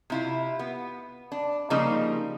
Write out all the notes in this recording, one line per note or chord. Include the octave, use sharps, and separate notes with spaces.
C3 E4 F4
B3
D4
C#3 F3 G3 A#3 D#4 F4